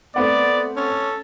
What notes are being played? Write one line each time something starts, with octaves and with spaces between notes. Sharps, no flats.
A3 B3 C4 D5 F#5
C#4 A4